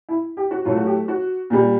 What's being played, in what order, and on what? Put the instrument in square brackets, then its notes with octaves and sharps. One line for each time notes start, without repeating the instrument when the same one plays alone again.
[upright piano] E4
G4
F#4
A2 F#3 A3 F4
F#4
G4
F#4
A#2 G3